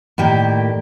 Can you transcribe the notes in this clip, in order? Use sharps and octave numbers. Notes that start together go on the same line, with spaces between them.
A2 D#3 A#3 G4 D5